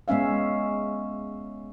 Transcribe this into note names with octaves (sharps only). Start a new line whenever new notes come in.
G#3 B3 C#4 E5 F5